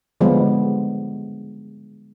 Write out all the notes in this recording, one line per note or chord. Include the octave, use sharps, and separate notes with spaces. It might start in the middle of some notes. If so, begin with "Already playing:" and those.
D3 F3 G3 G#3 B3